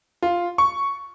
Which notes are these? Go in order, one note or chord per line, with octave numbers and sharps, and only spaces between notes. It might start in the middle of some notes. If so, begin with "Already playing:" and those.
F4
C#6